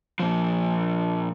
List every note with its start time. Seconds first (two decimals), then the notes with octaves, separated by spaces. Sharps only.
0.20 A#2 F3